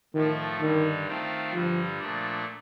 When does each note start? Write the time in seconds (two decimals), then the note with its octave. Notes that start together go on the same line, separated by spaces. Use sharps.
0.14 A2 D#3 F3 A3
0.60 G2 D3 D#3 G3
1.07 D#3 A3 C4 F4
1.53 G2 D3 F3 G3
1.99 A#2 F3 A3 D4